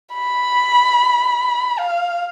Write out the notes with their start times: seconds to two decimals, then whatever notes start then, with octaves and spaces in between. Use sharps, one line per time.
0.14 B5
1.79 F5